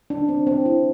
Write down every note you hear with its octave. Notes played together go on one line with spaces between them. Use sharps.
D4
C4
C4
E4